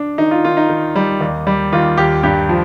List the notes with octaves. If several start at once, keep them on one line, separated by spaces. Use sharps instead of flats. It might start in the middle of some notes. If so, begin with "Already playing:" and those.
Already playing: D4
D#3 D#4
F4
D#3 F4
D#4
D#3
G3
D#2
G3
D#2 F4
D#2 G4
G2 G4
F3